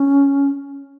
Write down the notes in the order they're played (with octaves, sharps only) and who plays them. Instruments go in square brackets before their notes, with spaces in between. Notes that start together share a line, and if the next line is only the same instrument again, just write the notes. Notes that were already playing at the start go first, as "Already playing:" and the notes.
Already playing: [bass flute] C#4